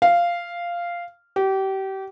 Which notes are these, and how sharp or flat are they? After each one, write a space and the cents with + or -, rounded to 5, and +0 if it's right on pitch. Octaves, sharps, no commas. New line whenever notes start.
F5 -10
G4 -30